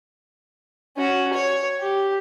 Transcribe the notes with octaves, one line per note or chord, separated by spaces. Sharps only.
C#4 F#4
C#5
G4